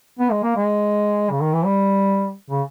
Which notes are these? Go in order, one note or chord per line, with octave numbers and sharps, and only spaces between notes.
B3
G#3
A#3
G#3
C#3
D#3
E3
G3
C#3